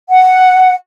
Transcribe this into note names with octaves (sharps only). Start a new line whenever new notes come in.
F#5